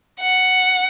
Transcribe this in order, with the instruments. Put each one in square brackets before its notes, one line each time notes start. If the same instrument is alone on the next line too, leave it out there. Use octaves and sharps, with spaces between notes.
[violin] F#5